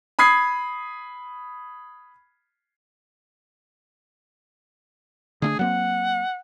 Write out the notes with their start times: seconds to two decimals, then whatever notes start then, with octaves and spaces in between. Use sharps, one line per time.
0.19 B5 D#6 G#6 C7
5.42 D3 A3 D4 G#4
5.59 F#3 A#3 C4 F#5